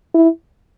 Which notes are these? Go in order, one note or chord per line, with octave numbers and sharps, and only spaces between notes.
E4